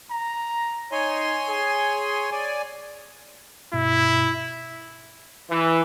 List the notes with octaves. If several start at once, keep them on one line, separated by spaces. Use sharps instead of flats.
A#5
D#4 C#5 G#5 C6
G#4
D5 G#5
G2 B2 E4
E3